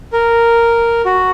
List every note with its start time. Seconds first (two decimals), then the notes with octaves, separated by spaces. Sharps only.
0.13 A#4
1.05 F#4